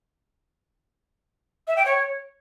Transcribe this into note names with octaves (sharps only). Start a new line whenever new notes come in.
E5
G5
C#5